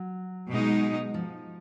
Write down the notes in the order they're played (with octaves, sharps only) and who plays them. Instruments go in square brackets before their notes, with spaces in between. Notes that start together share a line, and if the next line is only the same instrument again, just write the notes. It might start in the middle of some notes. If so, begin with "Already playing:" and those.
Already playing: [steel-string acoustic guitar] F#3
[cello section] B2 G#3 D#4
[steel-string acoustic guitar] F3